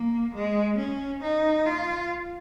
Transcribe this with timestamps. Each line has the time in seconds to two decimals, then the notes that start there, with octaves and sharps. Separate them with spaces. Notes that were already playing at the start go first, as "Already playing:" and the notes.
Already playing: A#3
0.34 G#3
0.78 C#4
1.23 D#4
1.66 F4